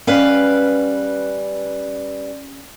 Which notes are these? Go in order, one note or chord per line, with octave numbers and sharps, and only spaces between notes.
G3 C#4 B4 D#5 F5 F#5